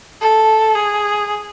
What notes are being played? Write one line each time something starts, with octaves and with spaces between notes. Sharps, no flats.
A4
G#4